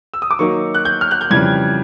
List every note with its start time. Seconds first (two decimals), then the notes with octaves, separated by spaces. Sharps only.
0.14 E6
0.22 D#6
0.31 D6
0.39 D#3 F#3 A#3 D#4 C#6
0.74 F#6
0.85 G6
1.01 F6
1.11 F#6
1.21 G6
1.30 F2 C#3 E3 G3 G#6